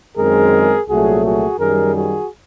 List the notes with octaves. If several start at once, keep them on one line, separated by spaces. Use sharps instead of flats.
F#2 D#3 G#3 C4 G#4 A#4
C2 A#2 F#3 A3 F#4 G#4
F#4 G#4
F#2 D#3 G3 G#4 A#4
F#4 G#4